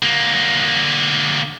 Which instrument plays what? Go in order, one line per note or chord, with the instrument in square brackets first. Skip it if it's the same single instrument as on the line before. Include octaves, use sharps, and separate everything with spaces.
[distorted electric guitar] D3 A#3